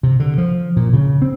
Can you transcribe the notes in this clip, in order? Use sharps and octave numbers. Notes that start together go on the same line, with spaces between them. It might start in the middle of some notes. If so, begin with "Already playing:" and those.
C3
D3
F3
A#2
C#3
C4